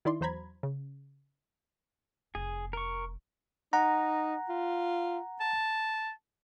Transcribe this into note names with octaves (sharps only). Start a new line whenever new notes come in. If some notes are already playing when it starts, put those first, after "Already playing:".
D#3 E4 D5 C6
E2 F#3 C5 A#5 B5 G#6
C#3
F1 G#4
A#4 C#6
D#4 F#5 A#5
F4
A5